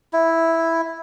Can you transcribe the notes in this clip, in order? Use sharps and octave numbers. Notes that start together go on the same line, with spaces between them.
E4